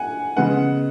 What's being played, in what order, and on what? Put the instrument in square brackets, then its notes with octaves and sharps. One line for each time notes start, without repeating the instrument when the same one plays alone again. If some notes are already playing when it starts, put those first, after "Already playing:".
Already playing: [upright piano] F#5 G#5
C#3 G#3 B3 F#5